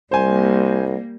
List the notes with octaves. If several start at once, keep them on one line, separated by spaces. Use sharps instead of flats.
C2 G3 A#3 C5 G#5